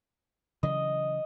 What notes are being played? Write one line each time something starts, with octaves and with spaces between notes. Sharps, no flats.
C#3 E3 F#3 D#5